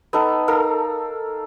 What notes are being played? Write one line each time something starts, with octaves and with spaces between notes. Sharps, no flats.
B3 D#4 A4
D#4 A4 A#4 F5